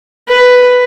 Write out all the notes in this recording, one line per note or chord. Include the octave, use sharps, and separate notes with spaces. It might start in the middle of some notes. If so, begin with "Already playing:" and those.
B4